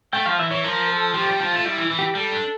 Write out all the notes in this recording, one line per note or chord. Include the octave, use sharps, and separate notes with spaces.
A3 G5
F3 F5
E3 E5
E3 C#5
F3 A#4
A4
F3 G4
A3
G3
F3 F4
A3
G3 E4
E3
E3
G4
G3 A4
D4